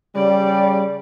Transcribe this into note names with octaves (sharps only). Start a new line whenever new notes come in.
C#3 G3 D5